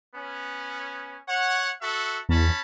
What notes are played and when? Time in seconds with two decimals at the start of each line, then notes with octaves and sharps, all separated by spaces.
0.15 B3 C#4
1.26 C#5 F#5
1.81 F#4 A4 E5
2.29 E2 C#4 A5 B5